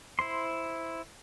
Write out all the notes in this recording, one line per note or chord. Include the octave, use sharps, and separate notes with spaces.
E4 C5 C6